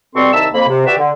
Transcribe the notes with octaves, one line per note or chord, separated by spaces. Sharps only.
B2 G3 C4 A4 C6 C#6
C2 D#3 E5 A5 E6
F2 A#3 B5
C3
F#4 G4 B4 D5 E5
D3